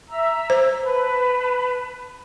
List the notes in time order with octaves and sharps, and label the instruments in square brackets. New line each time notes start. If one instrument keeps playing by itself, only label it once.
[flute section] E5 A#5 E6
[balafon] C5
[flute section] B4 A5